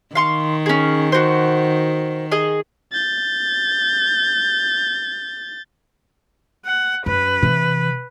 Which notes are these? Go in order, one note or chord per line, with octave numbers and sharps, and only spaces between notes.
D#3 F5 C6 C#6
C#4 G#4
F#4 C5
G#4 D#5
G6 A6
F#5
F#2 B4
C3 E3